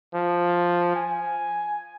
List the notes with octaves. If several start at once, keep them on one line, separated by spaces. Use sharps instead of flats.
F3
G#5